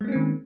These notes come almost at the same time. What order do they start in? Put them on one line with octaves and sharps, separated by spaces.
G#3 A#3 C#4 C4 D#3